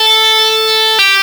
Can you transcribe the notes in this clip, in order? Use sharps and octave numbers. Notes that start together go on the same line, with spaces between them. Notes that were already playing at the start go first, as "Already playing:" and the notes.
Already playing: A4
G4